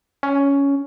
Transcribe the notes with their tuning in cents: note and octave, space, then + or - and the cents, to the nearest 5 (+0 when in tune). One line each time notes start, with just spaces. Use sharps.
C#4 +10